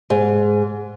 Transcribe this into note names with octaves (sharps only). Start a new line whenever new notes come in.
G#2